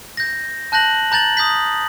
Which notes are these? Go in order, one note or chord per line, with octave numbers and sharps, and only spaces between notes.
G6 A#6
A5 F#6 G6 A#6 F#7
A#5 G6 A6 F#7
D#6 G6 B6